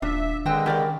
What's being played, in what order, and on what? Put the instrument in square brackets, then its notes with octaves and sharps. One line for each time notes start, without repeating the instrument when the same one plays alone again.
[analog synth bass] D#1 [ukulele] D4 F4 [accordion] E5
[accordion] D3 G#3 [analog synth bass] D#3 [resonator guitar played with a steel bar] C4 B4 G5
[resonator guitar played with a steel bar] C#3 E3 [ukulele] G4 A#4 D5